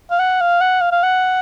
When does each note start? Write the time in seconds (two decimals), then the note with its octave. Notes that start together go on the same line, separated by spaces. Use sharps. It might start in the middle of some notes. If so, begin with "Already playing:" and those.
0.10 F5
0.19 F#5
0.41 F5
0.61 F#5
0.81 F5
0.92 F5
1.03 F#5